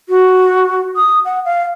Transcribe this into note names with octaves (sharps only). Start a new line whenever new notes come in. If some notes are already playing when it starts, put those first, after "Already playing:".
F#4
D#6
F#5
F5